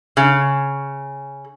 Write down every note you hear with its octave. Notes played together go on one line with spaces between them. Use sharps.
C#3